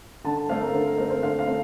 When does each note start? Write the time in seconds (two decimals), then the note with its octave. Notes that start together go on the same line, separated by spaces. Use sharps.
0.24 D3 A5
0.37 A5
0.48 A3 C4 F5
0.62 A#4
0.73 D3 C5
0.85 A#4
0.98 A3 C4 A#4
1.10 C5
1.22 D3 F5
1.39 F5
1.47 A3 C4